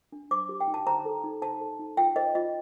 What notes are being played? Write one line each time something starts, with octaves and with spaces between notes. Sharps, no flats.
D4
C5 D6
G4
G5
D#4
A5
C5 A#5
A4
D#4
C5 A5
A4
D#4
F4 G5
C5 D#5
F4 D#5